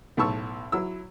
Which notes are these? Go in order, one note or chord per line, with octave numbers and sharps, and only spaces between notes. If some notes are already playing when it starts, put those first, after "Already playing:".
B1 A2 A5 C#6 E6
F#3 E4 E6